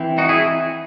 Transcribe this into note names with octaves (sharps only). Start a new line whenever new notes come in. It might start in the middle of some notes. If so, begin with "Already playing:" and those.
Already playing: E3 C4
D#4 F#4
E4 G#4